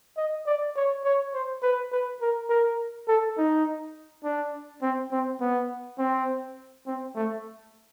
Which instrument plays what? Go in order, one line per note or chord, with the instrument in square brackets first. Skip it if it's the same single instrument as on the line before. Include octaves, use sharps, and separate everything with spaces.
[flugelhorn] D#5
D5
C#5
C#5
C5
B4
B4
A#4
A#4
A4
D#4
D4
C4
C4
B3
C4
C4
A3